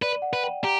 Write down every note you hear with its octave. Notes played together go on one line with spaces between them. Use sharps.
B4 D5
F#5
B4
G5
G4 A#5